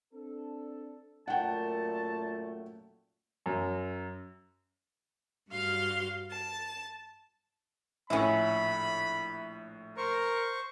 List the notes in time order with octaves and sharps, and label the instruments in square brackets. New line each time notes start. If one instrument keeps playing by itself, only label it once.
[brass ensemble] C4 D4 A4
[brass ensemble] F#2 A#2 A3 [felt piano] F#5 G5 [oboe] A5
[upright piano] F#2
[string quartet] G2 F#4 F5 C6 F6
A5
[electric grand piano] A#1 A2 [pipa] C#4 E4 [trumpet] B5
[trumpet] A#4 [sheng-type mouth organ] C5 C#6